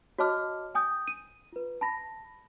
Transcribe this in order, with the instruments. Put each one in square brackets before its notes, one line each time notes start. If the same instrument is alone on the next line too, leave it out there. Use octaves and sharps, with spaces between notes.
[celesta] F#4 C#5 D#5 A5 D6 F6
G5 G#5 D#6 G6
D#7
F4 B4
A5 B5 A#6